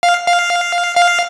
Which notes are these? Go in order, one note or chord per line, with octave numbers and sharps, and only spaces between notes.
F5
F5
F5